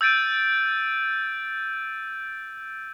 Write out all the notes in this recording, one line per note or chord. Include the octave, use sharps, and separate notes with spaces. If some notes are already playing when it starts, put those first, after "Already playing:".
E6 G6 A6 D7 D#7